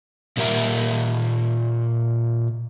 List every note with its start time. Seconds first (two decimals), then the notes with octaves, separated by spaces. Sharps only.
0.37 A#2 G4 A#4 E5 A#5